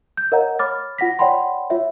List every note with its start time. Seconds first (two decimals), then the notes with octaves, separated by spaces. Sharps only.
0.17 G6
0.32 A#4 C#5 D#5 F5 F#5 A#5
0.59 C#5 B5 D6 F6 A6
0.98 F4 F#5 A#6 B6
1.19 C#5 D5 F#5 G5 B5 C6
1.70 F4 C#5 E5